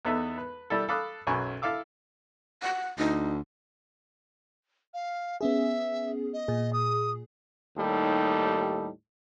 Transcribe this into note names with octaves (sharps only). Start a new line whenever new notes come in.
E2 B3 D#4 A4 B4 E5
B4
G3 E4 A4
A4 F5 B5 D6 D#6 F#6
B1 F#2 F#3 G#5 B5 C#6
E4 A4 F5 D6 E6
F#5
D2 D#4
F5
B3 C#4 G#4 E5
D#5
A#2 G#4
D#6
D#2 A2 G3 D#4 A4